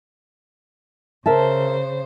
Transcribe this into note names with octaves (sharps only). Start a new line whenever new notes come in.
C#3 A#4 C5 E5 A5